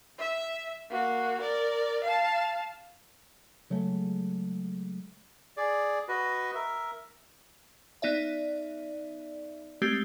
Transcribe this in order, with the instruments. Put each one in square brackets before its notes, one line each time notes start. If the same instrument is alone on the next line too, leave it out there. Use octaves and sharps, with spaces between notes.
[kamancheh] E5
A#3 F#4
A#4 D5
F5 A5
[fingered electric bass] C#3 F#3 G#3 A3
[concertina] G#4 D5
F#4 B4 D#5
A#4 E5
[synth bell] B3 D#4 D5 E5
G#3 A3 C4 G4